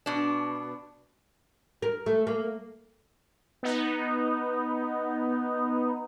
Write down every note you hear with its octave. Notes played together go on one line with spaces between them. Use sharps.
B2 D4
A#4
A3
A#3
B3 D#4